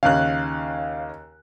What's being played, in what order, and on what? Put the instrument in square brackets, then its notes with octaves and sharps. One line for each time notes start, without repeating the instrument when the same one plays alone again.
[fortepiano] D#2 C#3 [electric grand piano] F5 F#6